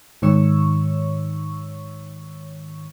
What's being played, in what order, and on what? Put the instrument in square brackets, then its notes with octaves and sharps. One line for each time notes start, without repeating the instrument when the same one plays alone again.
[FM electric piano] G#2 D#3 C#5 C#6 E6